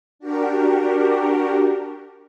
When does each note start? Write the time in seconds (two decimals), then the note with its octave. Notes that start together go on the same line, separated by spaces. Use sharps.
0.19 D4 F#4 G4 A#4